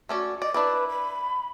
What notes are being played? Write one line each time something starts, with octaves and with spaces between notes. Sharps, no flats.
A3 C#4 F#4 D5
D5 D#5
D4 E4 B4 D5
B5